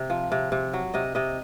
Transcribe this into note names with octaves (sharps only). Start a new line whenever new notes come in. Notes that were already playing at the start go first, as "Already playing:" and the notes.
Already playing: C3
F3
C3
C3
F#3
C3 D#5
C3 D#5